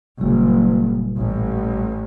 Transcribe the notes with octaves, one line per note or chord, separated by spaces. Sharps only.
F#1 A#2 G3
A1